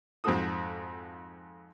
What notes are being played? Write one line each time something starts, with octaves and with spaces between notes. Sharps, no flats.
F2 G#2 C4 F#4 A4 D#6